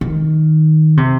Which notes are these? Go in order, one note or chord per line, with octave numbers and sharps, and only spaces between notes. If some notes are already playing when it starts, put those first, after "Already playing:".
D#3
C3